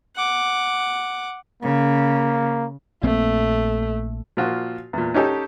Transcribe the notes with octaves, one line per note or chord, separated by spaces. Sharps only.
F#5 D6
C#3 A#3
A#1 A3 A#3 C4
A#2 F3 F4 F#4
E2 A#2
C#4 D#4 G4 A4